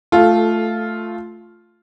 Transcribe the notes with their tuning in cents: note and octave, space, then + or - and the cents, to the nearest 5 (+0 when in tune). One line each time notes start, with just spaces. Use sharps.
A3 +0 F4 +0 A4 -20